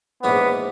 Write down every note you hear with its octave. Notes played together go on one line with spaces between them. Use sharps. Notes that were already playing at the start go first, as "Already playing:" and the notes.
A#1 G#2 E3 A#3 B3 C#4